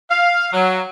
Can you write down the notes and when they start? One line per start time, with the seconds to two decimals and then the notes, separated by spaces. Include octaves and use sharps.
0.11 F5
0.53 F#3